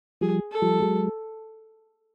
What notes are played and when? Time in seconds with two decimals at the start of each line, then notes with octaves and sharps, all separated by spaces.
0.21 F3 G3 G#4
0.52 A4
0.62 F3 G3
0.82 F#3 G#3